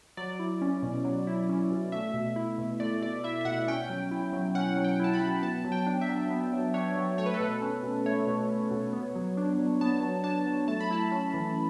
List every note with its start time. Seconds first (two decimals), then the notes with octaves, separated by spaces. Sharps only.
0.17 F#3 D5
0.39 E4
0.62 C#4
0.83 B2
1.04 F#3
1.27 E4
1.49 C#4
1.71 B2
1.92 A3 E5
2.14 B2
2.36 E4
2.58 B2
2.80 A3 D5
3.02 B2 D5
3.24 E4 E5
3.41 E5
3.45 B2 F#5
3.68 C#4 G5
3.90 F#3
4.11 E4
4.33 F#3
4.55 C#4 F#5
4.77 F#3
4.84 G5
5.00 E4 A5
5.14 B5
5.21 F#3
5.42 B3 A5
5.64 F#3
5.72 G5
5.86 D4
6.01 E5
6.09 F#3
6.30 B3
6.53 F#3
6.74 D4 C#5
6.96 F#3
7.18 A3 C#5
7.26 B4
7.34 A4
7.40 B2 B4
7.62 C#4
7.83 B2
8.06 A3 C#5
8.27 B2
8.49 C#4
8.71 B2
8.93 B3
9.15 F#3
9.37 D4
9.58 F#3
9.81 B3 A5
10.02 F#3
10.24 D4 A5
10.47 F#3
10.68 A3 A5
10.80 B5
10.91 E4 A5
11.12 C#4
11.34 E3